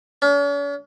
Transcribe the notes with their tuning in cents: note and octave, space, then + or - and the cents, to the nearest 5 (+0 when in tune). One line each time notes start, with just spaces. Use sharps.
C#4 +45